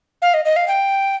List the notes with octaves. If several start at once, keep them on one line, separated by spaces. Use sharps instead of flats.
F5
D#5
D#5
F5
G5